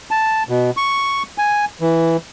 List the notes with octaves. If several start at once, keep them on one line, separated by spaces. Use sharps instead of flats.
A5
B2
C#6
G#5
E3